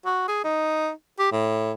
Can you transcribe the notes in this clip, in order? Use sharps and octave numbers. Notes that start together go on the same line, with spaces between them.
F#4
G#4
D#4
G4
A2